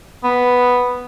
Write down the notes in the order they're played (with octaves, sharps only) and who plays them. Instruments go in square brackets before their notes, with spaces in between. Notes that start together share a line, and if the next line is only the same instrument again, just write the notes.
[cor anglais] B3